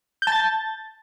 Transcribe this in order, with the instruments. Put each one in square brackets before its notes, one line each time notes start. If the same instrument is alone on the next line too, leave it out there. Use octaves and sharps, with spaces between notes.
[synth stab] G6
A5
A6